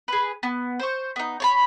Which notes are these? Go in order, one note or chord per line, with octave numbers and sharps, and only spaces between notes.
G#4 B4
B3
C5 C#6
B3 D#4
C#5 A5 B5